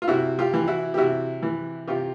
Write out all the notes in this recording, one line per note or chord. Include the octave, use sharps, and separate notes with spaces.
F4
C3 E4 F#4
F4 G4
E3
E4 F#4
G4
C3 E4 F#4
E3
C3 F4 G4